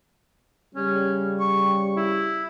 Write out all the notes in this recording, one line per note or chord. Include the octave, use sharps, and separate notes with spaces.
C#3 G3 C#4
C#6
E4